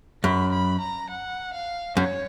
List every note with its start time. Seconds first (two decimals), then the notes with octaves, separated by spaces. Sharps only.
0.24 F#2 B5
0.52 B5
0.81 A#5
1.10 F#5
1.53 F5
1.96 F#2 C#5